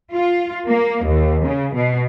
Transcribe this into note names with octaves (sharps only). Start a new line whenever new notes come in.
F4
A#3
D#2
C#3
B2